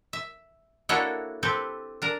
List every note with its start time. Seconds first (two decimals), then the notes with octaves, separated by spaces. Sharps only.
0.13 E5
0.89 A#3 D4 E4 F#4 A4 C#5
1.43 C4 G4 A4 B4
2.02 D4 A#4